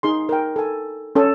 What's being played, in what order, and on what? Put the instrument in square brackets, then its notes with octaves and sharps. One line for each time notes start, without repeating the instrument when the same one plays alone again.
[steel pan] D#4 G#4 C6
A#4 G5
A4 G#5
C#4 A4 G#5